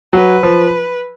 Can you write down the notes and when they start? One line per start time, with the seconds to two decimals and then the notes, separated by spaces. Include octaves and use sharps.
0.13 F#3 B4
0.43 F3